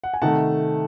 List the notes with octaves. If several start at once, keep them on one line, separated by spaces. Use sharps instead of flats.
F#5
G#5
C3 D#3 A3 F#5 A5